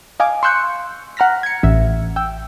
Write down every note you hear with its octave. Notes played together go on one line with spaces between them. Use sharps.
D#5 F5 G#5 D6
C6 C#6 E6 F#6 G6 C#7
F#5 A#5 F6 A#6 B6
G#6 C#7
A1 E5
G5 E6